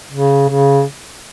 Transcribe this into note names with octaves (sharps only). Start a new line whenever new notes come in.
C#3
C#3